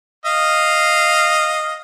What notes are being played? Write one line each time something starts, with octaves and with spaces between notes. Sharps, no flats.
D#5 F5